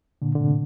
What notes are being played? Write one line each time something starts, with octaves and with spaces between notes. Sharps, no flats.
A#2 D3
D3
A2 C3